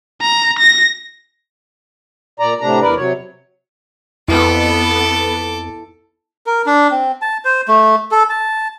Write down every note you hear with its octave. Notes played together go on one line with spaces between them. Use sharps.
A#5
A#6
A#2 D5 A#5
A2 C3 D4 A#5
E2 A#4 B4 D5
C3 F#3 C#5
F2 B3 E4 A4 D6
A#4
D4
C4
A5
C5
A3
A4
A5